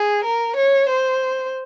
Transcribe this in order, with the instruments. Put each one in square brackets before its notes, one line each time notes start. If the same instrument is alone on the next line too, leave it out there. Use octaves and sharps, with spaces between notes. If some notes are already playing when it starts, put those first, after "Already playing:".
Already playing: [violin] G#4
A#4
C#5
C5